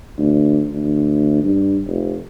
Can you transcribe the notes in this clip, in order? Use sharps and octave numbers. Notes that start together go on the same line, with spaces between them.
D2
D2
G2
F1